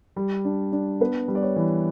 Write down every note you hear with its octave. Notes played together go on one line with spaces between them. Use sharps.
G3
D4
D4
B3 B4
G3
D5
C#5
E3